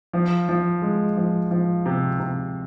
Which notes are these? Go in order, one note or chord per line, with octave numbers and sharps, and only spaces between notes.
F3
F3
G#3
F3
F3
C3
C3